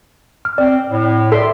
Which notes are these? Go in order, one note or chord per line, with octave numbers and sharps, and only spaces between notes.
F6
C4 D5
A2
A4 D5 E5 C6